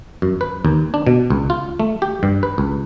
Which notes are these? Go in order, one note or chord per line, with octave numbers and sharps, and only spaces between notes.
F#2
B4
D#2
D4
B2
C#2
F4
A3
G4
G2
B4
C#2